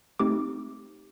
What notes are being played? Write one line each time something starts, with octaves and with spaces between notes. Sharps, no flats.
A3 C4 D#4 G4 D6